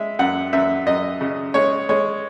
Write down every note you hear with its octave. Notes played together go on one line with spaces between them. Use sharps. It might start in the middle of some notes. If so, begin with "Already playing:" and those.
Already playing: G#3 E5
F#2 F#5
F#2 E5
F#2 D#5
C#3
G#3 C#5
G#3 C#5